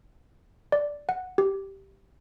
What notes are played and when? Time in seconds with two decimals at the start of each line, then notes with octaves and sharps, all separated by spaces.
0.72 D5
1.09 F#5
1.38 G4